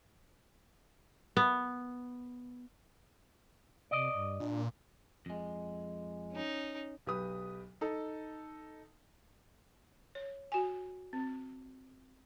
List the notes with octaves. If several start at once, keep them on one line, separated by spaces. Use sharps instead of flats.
B3
C3 D5 D#5
G2
A#2 D4
F2 G#3
C#4 D#4
B1 G4 B4 D#6
D#4 A4
C#5
F#4 G#5
C4